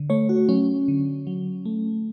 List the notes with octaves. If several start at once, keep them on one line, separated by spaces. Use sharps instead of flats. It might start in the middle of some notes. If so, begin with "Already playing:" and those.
Already playing: D3
A3 C#5
F#4
F#3 C#4
D3
F#3
A3